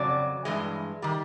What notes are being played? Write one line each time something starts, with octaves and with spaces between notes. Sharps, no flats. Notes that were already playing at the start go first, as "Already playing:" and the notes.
Already playing: F2 C#3 F#3 D5
G2 E3 G#3
D#3 G3